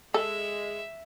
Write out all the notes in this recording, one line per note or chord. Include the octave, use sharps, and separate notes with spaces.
G#3 A4 E5